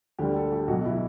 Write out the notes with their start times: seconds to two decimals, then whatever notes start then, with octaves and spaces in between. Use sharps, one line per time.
0.19 D2 D3 G3 G4
0.36 A4
0.52 G4
0.68 B1 B2 F#3 F#4
0.85 E4